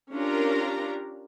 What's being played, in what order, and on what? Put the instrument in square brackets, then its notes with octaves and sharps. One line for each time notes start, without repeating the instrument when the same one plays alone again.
[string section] C#4 D4 F4 G4 A#4 A#5